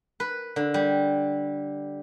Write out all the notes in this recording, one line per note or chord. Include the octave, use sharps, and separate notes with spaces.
B4
D3
G3